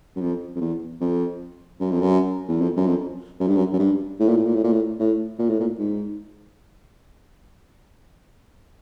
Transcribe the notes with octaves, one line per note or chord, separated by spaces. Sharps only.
F#2
F2
F2
E2
F2
F#2
F2
F#2
E2
F2
F#2
F2
F#2
G2
F#2
F#2
G2
A2
A#2
A2
A#2
A2
A#2
A2
A2
A#2
A2
A#2
G#2